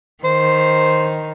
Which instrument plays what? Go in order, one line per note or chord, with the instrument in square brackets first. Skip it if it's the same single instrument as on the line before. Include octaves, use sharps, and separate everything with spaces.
[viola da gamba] D#3 [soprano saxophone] C5